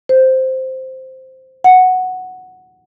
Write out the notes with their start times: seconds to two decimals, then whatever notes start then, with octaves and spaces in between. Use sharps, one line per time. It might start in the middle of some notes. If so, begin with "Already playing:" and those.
0.09 C5
1.64 F#5